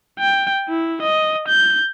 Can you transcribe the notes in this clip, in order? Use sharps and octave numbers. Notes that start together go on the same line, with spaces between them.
G5
E4
D#5
G6